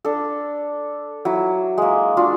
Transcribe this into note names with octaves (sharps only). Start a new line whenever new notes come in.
D4 A4
F#3 E4
G#3 A#3
G#3 D4 F4 F#4